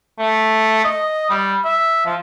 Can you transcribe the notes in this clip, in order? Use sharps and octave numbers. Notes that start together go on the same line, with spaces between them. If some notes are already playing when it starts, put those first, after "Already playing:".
A3
D#5
G3
E5
F3